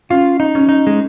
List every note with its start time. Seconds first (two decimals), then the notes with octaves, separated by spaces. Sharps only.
0.10 C#4 F4
0.40 D#4
0.55 C#4
0.69 D#4
0.87 G#3